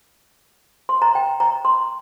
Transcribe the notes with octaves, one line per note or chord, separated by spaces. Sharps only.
C6
A#5
G5
A#5
C6